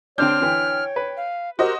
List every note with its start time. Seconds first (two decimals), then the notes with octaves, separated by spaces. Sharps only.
0.18 D3 C4 D4 C#5 G5 F6 G6
0.41 D3 E3
0.96 B4
1.17 F5
1.59 F#4 G4 A#4 C5 D#5